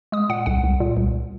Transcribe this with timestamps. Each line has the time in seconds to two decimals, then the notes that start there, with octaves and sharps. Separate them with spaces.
0.12 G#3 D#6
0.29 A#2 F#5
0.46 C2 F#5
0.64 C2
0.80 A#2
0.97 C2